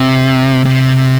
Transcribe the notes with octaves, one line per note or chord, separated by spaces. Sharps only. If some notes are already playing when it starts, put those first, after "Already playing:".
Already playing: C3
C3